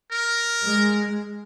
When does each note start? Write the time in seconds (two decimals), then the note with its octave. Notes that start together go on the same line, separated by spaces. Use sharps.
0.11 A#4
0.63 G#3